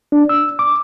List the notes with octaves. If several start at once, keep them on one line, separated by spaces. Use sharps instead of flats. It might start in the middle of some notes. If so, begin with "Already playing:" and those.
D4
E6
D6